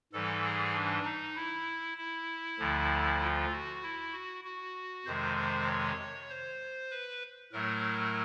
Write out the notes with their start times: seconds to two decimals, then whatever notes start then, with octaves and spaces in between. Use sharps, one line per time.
0.13 G#2 E3 G3 A4
0.44 G#4
0.74 D4
1.05 D#4
1.36 E4
1.98 E4
2.59 D2 D3 F3
3.21 F4
3.52 F#4
3.83 E4
4.13 F#4
4.44 F#4
5.06 F2 C3 D#3 G#3 C5
5.37 C5
5.67 C#5
6.30 C5
6.91 B4
7.52 A2 F#3 A3 A#4